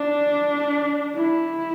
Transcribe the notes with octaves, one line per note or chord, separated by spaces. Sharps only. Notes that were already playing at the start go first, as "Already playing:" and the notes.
Already playing: D4
E4